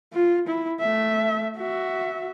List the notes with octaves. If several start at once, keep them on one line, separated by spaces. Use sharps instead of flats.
F4
E4
A3 E5
F#4 E5